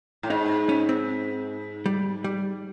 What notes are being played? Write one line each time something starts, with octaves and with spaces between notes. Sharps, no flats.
A2
G#2 D#4
C#4
C4
G3
G3